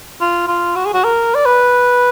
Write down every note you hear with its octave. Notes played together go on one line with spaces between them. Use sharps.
F4
F4
F#4
G#4
F#4
A#4
D5
B4